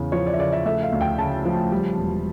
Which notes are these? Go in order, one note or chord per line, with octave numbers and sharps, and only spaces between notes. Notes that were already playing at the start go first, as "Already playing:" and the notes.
Already playing: E2 C#3
F3 C#5
D5
E5
C#3 D5
E5
A3 E5
F5
D2
G5
C#3 A5
F3
G3
E1